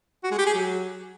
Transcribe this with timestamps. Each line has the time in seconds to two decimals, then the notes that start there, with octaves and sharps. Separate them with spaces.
0.24 F#4
0.31 G#3
0.39 G4
0.46 G#4
0.54 F#3